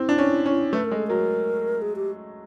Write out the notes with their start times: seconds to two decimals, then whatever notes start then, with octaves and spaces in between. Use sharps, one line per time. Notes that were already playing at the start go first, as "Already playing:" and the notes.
Already playing: C4 E4
0.09 D4
0.18 C#4
0.46 C#4
0.73 A3 B4
0.85 A#4
0.91 G#3
0.96 A4
1.07 F#3 A#4
1.82 G#4
1.96 G4